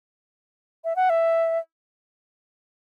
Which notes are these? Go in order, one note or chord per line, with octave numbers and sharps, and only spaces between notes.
E5
F#5
E5